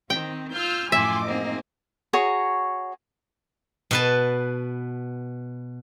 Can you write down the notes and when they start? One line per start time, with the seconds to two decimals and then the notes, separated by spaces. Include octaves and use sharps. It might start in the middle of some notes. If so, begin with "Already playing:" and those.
0.10 D#3 C4 G5
0.53 F4 E6 F6 G6
0.92 F#2 A2 F3 E5 G#5 C6 D6
1.27 G#2 A#3 C4 D#5
2.13 F#4 G#4 C#5 A#5
3.91 B2 B4 A5